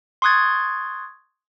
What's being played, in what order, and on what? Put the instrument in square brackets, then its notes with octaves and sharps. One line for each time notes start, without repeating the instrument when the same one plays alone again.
[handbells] C6 C#6 D#6 F#6 G#6 A6